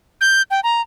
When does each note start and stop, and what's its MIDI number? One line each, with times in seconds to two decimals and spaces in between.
0.21 0.42 91
0.51 0.60 79
0.64 0.81 82